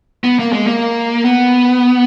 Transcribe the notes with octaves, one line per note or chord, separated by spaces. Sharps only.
B3
A#3
G#3
A#3
B3